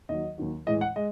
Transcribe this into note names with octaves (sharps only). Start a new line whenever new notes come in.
D#2 D#3 F#3 D#5
D#2 D#3 F#3
A2 E3 G#3 D#5
F#5
G#3 D#5